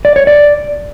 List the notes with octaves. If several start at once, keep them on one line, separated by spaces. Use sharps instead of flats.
D5
C#5
D5